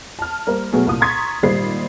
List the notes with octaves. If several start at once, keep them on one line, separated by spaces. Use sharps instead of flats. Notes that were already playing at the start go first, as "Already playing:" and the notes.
A5 F6
G3 A#3 A#4 C5
B2 F#3 A3 B3 G#4
C2 A#2 D#6
A#5 C6 C#6 G#6 A6 B6
G#1 A#2 G3 C5 C7